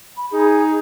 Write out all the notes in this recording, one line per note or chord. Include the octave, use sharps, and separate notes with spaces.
B5
D#4 G#4